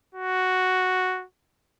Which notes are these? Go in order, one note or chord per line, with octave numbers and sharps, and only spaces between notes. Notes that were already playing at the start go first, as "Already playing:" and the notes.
F#4